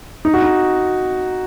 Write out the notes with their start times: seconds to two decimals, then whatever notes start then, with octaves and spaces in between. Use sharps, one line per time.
0.25 D#4
0.34 F#4
0.42 D#4